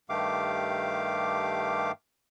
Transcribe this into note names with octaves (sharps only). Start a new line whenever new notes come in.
G2 D#3 A3 G4 F5 D6